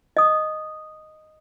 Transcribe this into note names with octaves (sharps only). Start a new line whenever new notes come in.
D#5 D#6